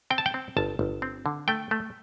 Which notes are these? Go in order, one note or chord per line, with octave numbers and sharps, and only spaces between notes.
C4 G5
A5
G5
C4
G1 A5
G1
C4
D3
A3 G5
A3